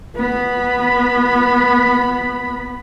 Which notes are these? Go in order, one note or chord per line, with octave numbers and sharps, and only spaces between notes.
B3 B5